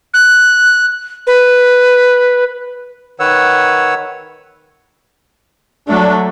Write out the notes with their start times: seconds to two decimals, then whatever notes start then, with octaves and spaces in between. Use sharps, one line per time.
0.14 F#6
1.27 B4
3.20 D#3 B4 C#5 F#5 E6
5.88 F#3 A3 D4